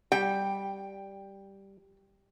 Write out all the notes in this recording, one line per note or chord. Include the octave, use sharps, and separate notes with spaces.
G3 G5